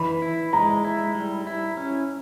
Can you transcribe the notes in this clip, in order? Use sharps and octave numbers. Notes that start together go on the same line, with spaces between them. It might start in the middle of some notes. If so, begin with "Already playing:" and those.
Already playing: E3 B5
E4
G#3 A#5
E4
G3
E4
C#4